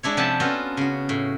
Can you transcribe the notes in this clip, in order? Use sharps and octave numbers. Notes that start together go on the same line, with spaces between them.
G#3 D4 E4 C#5
C3 F3 G4 F#5 A5
B3 C#4 F4 F#4 A4
C#3 F#4
A2